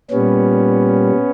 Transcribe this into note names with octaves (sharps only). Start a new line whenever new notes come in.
A#2 G3 B3 C#4